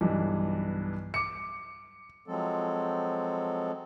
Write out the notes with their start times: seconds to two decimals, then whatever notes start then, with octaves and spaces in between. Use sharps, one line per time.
0.01 B1 G2 E3
1.14 D6 C#7
2.28 F3 F#3 G#3 C4 A4